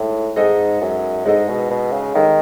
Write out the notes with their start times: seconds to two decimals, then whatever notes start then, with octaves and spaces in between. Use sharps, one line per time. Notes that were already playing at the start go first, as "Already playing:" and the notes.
Already playing: A2 G#3 D#4
0.36 G#2 G#3 D#4 A4 D#5
0.81 F#2
1.25 G#2 G#3 D#4 A4 D#5
1.48 B2
1.71 B2
1.92 C#3
2.15 D#3 G#3 D#4 A4 D#5